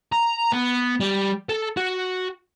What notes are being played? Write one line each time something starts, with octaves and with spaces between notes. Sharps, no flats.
A#5
B3
G3
A4
F#4